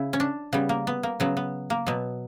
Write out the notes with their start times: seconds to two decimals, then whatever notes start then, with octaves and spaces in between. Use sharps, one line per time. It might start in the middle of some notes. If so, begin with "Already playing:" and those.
Already playing: C#3 E4
0.13 C#4
0.20 D4
0.53 C#3 G3 B3
0.69 A#3
0.87 B3
1.03 A#3
1.20 C#3 F#3 B3
1.37 B3
1.70 A#3
1.87 B2 F#3 B3